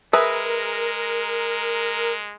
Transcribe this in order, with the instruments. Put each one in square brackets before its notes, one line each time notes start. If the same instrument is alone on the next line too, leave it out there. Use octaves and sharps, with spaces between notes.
[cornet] G#3 [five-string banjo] G#4 B4 E5 [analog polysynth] A#4